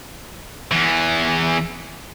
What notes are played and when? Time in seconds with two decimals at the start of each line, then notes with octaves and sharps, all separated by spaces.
0.72 E2 E3